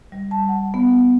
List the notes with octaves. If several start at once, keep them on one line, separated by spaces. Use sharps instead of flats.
G3
A5
F#5
B3